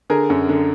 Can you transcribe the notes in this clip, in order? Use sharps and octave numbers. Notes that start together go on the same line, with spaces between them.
D3 G#4 A#4
F#2
D3